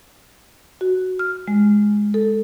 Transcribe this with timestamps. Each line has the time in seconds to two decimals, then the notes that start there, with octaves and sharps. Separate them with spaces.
0.81 F#4
1.19 F6
1.48 G#3
2.14 A4